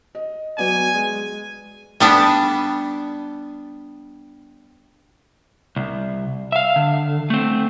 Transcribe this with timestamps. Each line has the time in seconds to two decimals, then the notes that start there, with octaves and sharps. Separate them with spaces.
0.15 D#5
0.58 F#3 B3 D5 G#5
0.94 G#3
2.00 G3 B3 D4
5.76 C2
6.52 E5 F5
6.76 D3
7.30 A3 C4